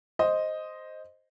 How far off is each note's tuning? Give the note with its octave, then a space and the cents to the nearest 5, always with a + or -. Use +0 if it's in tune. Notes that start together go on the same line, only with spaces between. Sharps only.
C5 +0 D#5 +0